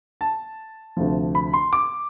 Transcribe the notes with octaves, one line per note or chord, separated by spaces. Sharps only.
A5
D2 C3 F3
B5
C6
D6